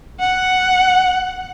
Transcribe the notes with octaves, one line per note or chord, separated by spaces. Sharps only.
F#5